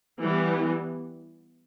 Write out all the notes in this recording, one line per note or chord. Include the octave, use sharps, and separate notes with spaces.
E3 G3 B3